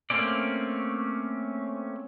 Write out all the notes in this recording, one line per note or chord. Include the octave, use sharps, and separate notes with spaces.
A3 A#3 C4 C#4 D5